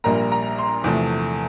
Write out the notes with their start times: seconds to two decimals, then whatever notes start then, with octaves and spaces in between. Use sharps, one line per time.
0.04 A#1 A#2 G3 A#3 A#5
0.32 A#5
0.58 C6
0.84 E2 C3 F3 A3